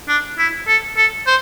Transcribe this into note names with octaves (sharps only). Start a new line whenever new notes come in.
D4
E4
A4
A4
C5